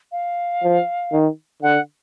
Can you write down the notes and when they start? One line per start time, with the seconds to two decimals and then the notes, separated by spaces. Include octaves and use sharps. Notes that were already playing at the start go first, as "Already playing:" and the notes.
0.12 F5
0.63 F3
1.12 D#3
1.62 D3 F#5